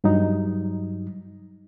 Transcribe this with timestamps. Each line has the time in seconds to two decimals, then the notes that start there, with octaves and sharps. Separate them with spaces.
0.04 G2 F#3 G3 D#4